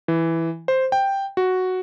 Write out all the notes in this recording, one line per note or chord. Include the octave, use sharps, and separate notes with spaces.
E3
C5
G5
F#4